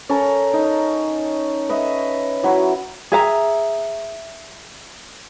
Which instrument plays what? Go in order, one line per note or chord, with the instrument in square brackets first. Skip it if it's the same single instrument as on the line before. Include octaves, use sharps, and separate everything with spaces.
[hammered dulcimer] C#4 A4 A#4
D#4
B4 D#5 E5
F#3 E4 F#4
[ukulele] G#4 E5 A#5